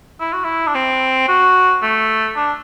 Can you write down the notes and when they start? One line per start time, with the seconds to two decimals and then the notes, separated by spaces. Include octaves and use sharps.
0.20 E4
0.33 F#4
0.44 E4
0.67 D4
0.75 C4
1.28 F#4
1.82 A3
2.36 D4